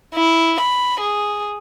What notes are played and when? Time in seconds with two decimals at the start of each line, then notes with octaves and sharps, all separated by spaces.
0.15 E4
0.60 B5
1.00 G#4